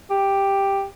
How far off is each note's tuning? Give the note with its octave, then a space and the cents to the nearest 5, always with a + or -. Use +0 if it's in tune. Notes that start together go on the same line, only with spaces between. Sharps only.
G4 +5